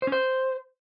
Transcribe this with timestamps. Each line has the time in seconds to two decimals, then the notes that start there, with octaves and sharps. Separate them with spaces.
0.02 C5
0.07 C#4
0.12 C5